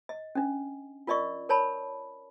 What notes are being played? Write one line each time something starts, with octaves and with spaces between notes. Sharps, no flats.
D#5
C#4 D4
F4 A#4 D5 D#5 C#6
A#4 C#5 A5 B5